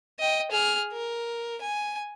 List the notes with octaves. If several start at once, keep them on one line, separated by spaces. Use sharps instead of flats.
D#5 G5
G#4 F6
A#4
G#5